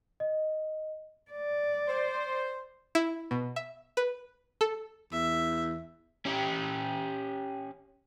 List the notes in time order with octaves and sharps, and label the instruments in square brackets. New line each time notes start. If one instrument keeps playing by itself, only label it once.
[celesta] D#5
[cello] D5
[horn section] C5
[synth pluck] E4
B2
E5
B4
A4
[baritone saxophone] E2 [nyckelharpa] E5
[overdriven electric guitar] C#4 G4